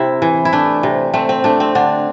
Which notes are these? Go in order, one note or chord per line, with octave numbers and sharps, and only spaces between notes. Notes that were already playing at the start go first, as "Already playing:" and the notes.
Already playing: C3 E4
E3
E4
A3 D4
C3
A3 C4
C4
A3 D4
C4
D3 D4